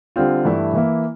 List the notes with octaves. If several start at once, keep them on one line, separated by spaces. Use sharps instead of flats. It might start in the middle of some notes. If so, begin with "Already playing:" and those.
D3 G3 C4 F4
G2 E3 A3 E4
E3 A#3 E4